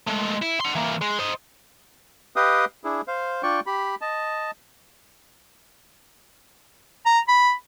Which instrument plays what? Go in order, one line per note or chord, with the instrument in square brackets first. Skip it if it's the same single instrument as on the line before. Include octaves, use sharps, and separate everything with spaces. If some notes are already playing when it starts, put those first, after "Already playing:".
[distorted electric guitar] G#3 A3
E4
F#5 C6
E3 A#3
G#3
C5 D#5
[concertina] G4 B4 D#5 F5 G5 D#6
D4 E4 G#4
C5 F5
D4 F4 D5 G5 C#6
G4 B5
D#5 A5
[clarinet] A#5
B5